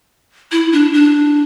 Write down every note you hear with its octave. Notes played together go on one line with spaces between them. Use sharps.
E4
D4
D4